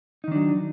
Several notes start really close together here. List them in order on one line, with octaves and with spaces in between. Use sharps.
D#4 D#3 D4 F#3